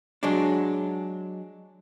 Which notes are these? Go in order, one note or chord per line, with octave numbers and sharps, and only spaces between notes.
F#3 G#3 D4